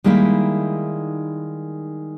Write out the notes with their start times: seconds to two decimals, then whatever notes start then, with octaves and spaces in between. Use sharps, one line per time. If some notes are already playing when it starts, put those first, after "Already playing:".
0.04 D#3 G3 G#3 A#3 D#4 E4